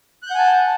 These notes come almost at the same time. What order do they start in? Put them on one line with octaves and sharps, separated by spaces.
F#6 G6 F#5 G#5 A5